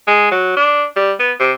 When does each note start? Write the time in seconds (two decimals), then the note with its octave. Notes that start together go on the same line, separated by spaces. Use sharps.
0.08 G#3
0.31 F#3
0.57 D4
0.96 G3
1.20 B3
1.40 C3